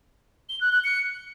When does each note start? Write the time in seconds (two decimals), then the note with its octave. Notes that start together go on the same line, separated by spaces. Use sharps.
0.49 G7
0.61 F#6
0.72 F#6
0.84 C#7